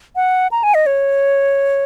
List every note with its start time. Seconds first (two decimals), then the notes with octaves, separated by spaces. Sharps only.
0.16 F#5
0.51 A#5
0.63 G#5
0.74 D#5
0.86 C#5